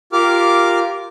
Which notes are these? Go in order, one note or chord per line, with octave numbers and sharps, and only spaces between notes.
F4 G4 A#4 D6 F6